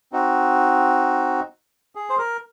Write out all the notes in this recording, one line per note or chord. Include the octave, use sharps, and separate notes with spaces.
C4 D#4 F#4
G#4
C5
A#4